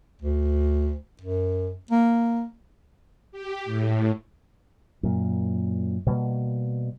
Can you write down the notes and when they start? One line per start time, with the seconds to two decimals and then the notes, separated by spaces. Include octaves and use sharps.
0.22 D2
1.22 F#2
1.91 A#3
3.32 G4
3.65 A2
5.03 F#2 A#2
6.07 B2 G3 A#3